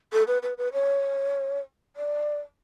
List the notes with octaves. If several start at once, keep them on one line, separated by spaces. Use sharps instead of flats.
A4
B4
B4
B4
C#5
D5